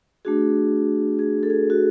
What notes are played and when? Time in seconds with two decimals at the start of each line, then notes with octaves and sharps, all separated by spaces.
0.25 A3 D4 F#4 G#4
1.19 G#4
1.43 A4
1.50 G#4
1.70 F#4